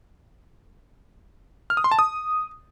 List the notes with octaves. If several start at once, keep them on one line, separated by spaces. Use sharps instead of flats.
F6
D#6
C6
A5
D#6